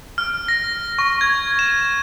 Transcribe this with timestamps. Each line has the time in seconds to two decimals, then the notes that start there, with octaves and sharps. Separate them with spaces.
0.18 F6
0.48 A#6
0.99 C#6
1.21 G#6
1.59 E7